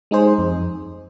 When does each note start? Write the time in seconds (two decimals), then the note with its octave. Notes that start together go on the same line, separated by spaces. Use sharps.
0.11 G#3 D#4 G#4 C5
0.38 F2